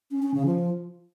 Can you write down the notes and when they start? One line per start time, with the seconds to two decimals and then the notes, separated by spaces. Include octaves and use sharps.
0.11 C#4
0.22 C#4
0.34 C#3
0.46 F3